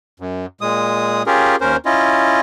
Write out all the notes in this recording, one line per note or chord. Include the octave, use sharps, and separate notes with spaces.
F#2
A#2 G#3 D#6
C#4 F4 G4 G#4 A#4
D#2 C#4 A#4 C5
C#4 E4 F4 D#5